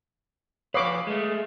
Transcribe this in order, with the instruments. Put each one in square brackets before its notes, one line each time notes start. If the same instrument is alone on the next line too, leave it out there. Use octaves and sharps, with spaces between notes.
[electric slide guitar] F2 B4 [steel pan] C#5 D6 [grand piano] F5 D#6 C7
[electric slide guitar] G#3 A3